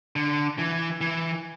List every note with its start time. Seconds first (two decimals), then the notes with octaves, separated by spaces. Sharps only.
0.16 D3
0.59 E3
1.01 E3